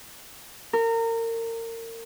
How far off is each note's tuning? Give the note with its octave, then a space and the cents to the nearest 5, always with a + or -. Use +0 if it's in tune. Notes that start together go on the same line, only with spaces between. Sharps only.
A#4 -30